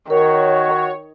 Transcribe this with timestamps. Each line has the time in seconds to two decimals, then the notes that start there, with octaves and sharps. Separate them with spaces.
0.10 D#3 F#4 A#4 C#5